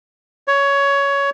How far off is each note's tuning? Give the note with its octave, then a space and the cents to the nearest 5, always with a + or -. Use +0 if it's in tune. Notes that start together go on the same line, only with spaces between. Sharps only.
C#5 +15